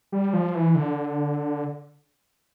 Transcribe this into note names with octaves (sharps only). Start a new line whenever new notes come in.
G3
F3
E3
D3